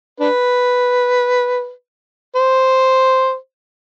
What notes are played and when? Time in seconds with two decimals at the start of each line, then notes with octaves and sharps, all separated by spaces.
0.20 D4 B4
2.36 C5